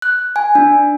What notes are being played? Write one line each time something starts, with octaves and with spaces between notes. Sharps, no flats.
F#6
G#5
D4